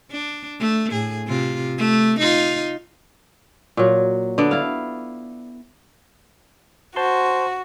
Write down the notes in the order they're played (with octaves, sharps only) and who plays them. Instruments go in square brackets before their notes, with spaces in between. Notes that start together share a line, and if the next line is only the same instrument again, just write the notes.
[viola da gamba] D4
A3
A2 G#4
C3 F4
A3
D#4 F4
[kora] A#2 F#3
D3 B3 A4 D5
E4 F5
[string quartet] F#4 [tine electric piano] C5 A5 C6